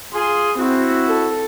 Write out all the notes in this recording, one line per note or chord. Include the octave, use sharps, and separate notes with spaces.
F4 G#4 C6
C4 E4 F#4
A4